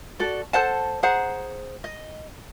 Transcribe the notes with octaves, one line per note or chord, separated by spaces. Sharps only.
F#4 A4 D5
A4 C5 F#5 A5
G#4 C5 F#5 A#5
D#5